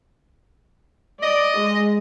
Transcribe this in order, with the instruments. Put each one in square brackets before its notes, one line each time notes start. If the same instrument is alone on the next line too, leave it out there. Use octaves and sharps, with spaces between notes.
[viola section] D5 [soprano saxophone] D#5
[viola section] G#3